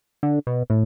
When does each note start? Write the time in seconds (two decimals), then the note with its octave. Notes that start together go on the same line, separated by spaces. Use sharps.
0.23 D3
0.47 B2
0.70 A2